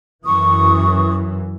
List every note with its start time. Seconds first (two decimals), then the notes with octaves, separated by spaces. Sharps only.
0.25 F#2 E3 C#6 D#6